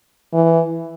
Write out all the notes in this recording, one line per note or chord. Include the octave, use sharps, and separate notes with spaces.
E3